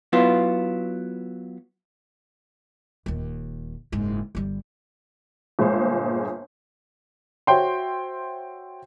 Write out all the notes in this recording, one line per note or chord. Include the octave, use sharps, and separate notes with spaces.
F#3 B3 E4 F4
D#1 D#2
F#1 G#2
G1 G3
G1 A#2 G#3 C5
F#4 C5 C#5 E5 G5 C6